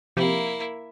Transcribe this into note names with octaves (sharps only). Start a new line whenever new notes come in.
C3 F3 A#3 E4 G4